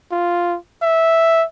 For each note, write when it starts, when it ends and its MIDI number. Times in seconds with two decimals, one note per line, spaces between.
0.11 0.57 65
0.82 1.44 76